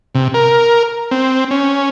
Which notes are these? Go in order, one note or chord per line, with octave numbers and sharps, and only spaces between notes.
C3
A#4
C4
C#4